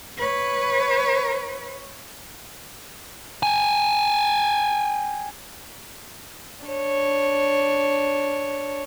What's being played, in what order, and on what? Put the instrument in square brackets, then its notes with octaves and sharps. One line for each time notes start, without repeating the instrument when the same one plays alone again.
[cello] B4 C#5
[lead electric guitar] G5 G#5
[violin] D4 C#5